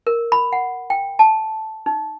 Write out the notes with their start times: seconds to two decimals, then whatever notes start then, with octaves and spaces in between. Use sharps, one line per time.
0.07 A#4
0.32 B5
0.53 F#5
0.90 G5
1.19 A5
1.86 D#4